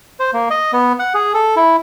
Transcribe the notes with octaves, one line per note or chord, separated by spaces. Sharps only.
C5
A#3
D#5
B3
F#5
G#4
A4
E4